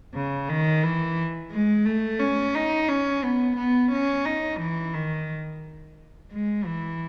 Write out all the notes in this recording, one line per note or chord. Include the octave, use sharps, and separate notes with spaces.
C#3
D#3
E3
G#3
A3
C#4
D#4
C#4
B3
B3
C#4
D#4
E3
D#3
G#3
E3